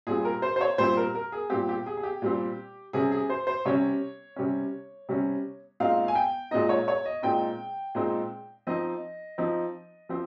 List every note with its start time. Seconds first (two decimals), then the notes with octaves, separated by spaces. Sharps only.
0.07 A#2 G3 C4 G#4
0.25 A#4
0.42 C5
0.56 C5
0.61 C#5
0.78 A#2 G3 C4 C5
0.97 A#4
1.15 A#4
1.32 G#4
1.50 A#2 G3 C4 G4
1.69 G4
1.86 G#4
1.97 G#4
2.03 G4
2.22 A#2 G3 C4
2.93 C3 G3 C#4 G#4
3.12 G#4
3.30 C5
3.47 C5
3.65 C3 G3 C#4 C#5
4.36 C3 G3 C#4
5.09 C3 G3 C#4
5.80 A#2 G#3 C4 D#4 F5
6.08 G#5
6.15 G5
6.51 A#2 G#3 C4 D#4 D#5
6.69 C#5
6.88 C#5
7.06 D#5
7.22 A#2 G#3 C4 D#4 G5
7.95 A#2 G#3 C4 D#4
8.67 F3 C4 D#4 D#5
9.38 F3 C4 D#4
10.09 F3 C4